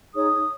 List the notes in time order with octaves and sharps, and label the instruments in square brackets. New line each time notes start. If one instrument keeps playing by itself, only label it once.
[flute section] D#4 G#4 C#5 D#6